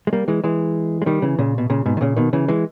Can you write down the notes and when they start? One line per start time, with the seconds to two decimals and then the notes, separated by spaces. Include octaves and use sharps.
0.07 G#3
0.13 G3 A#3
0.28 E3 G#3
0.44 E3 G#3
1.02 G#3
1.06 D#3 G3
1.22 C#3 E3
1.38 A#2 C#3
1.58 B2
1.70 A#2 C#3
1.86 G#2 B2
1.97 D#3
2.01 A#2 C#3
2.17 B2 D#3
2.33 C#3 E3
2.48 E3 G#3